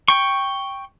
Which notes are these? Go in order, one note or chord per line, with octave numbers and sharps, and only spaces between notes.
G5 C#6